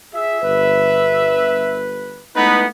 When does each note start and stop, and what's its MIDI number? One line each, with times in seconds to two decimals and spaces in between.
0.14 0.39 65
0.14 0.39 68
0.14 1.78 76
0.43 2.26 31
0.43 2.26 71
2.36 2.67 56
2.36 2.67 57
2.36 2.65 59
2.36 2.65 63
2.36 2.67 64
2.36 2.65 71